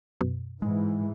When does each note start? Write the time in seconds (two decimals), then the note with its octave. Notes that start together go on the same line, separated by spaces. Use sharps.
0.21 F#2 B2
0.62 G#2 E3 G#3